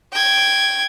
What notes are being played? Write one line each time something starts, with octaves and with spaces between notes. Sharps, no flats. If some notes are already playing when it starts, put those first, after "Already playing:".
G5 G#6